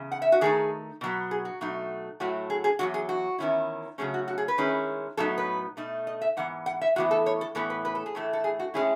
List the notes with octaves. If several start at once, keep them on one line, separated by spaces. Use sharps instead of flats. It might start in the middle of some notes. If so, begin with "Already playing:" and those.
Already playing: E2 C#3
F#5
E5
F#4
D#3 A3 D#4 G#4
B2 F#3 B3
G#4
F#4
B2 F#3 A3 D#4
A2 F#3 A3 F#4
G#4
G#4
E2 B2 F#3 F#4
G#4
F#4
E2 D#3 G#3 C#4 E4
C#3 F#3 A3 C#4 G#4
F#4
F#4
G#4
B4
D#3 G#3 C#4 E4
A2 F#3 B3 D#4 A4
B4
B2 A3 D#4
D#5
E5
G#2 E3 B3 F#5
F#5
E5
A2 E3 B3 F#4
A4
C#5
A4
A2 E3 B3 A4
B4
B4
A4
G#4
A2 E3 A3 A4
A4
G#4
F#4
A2 G#3 C#4 E4 G#4